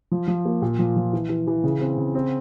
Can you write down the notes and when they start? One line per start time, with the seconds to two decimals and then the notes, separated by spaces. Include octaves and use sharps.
0.12 F3
0.28 F3
0.45 A#3
0.62 A#2
0.79 F3
0.96 F3
1.13 E3
1.29 E3
1.47 E3
1.64 C#3
1.81 C4
1.98 C#3
2.15 C4